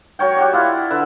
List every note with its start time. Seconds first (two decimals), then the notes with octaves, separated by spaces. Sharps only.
0.19 F#3 A#4 C#5 G5
0.36 F#4 G4 D5
0.53 E4 F4 F#5
0.90 D3 B4 E5